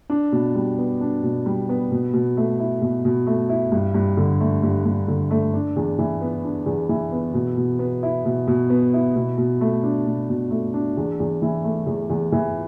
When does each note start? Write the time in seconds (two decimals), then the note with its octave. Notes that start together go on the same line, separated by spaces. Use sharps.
0.10 D4
0.32 B2
0.55 G3
0.78 B3
1.01 D4
1.23 B2
1.46 G3
1.69 B3
1.91 B2
2.13 B2
2.37 A3
2.59 E4
2.82 B2
3.05 B2
3.27 A3
3.49 E4
3.72 G2
3.94 G2
4.17 D3
4.40 A3
4.63 G2
4.85 G2
5.08 D3
5.31 A3
5.54 D4
5.76 E2
5.99 E3
6.21 B3
6.44 D4
6.66 E2
6.89 E3
7.12 B3
7.34 B2
7.57 B2
7.79 B3
8.03 E4
8.25 B2
8.47 B2
8.70 B3
8.93 E4
9.16 B2
9.38 B2
9.61 A3
9.84 D4
10.06 B2
10.29 B2
10.51 A3
10.74 D4
10.97 E2
11.20 E2
11.42 E3
11.64 A3
11.86 E2
12.10 E2
12.32 E3